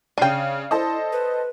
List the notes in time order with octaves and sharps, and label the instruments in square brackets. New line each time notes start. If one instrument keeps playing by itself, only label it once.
[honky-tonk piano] C#3 C7 D#7 [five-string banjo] D4 G5
[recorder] E4 [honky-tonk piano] A4 C5 D#5
[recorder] B4